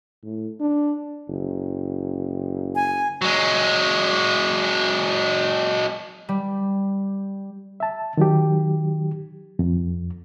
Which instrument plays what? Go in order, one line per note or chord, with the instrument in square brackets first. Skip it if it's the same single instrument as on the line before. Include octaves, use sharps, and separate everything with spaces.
[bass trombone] A2
D4
[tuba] F#1
[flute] G#5
[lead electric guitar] F#3 G#3
[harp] G3
[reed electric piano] E5 A5
D#3 F#3 G4
F2